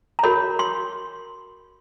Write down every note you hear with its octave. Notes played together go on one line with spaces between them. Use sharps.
A#5
F#4 A#4 C#5 B5
C6